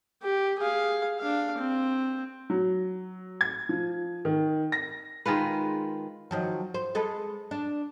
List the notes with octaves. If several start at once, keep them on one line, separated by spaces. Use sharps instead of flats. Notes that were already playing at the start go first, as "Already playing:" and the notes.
G4
G#4 F5
D4 F5
C4
F#3
G#6
F3
D#3
A#6
D#3 G#3 F4 B4
D#3 F3 F#3
C5
G#3 A4 B4
D4